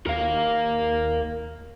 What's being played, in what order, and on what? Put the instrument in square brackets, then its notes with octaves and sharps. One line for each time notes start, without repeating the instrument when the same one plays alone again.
[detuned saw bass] D#2 [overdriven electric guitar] A#4 F5